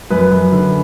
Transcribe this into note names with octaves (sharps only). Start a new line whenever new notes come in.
F#2 B4
F#2
D3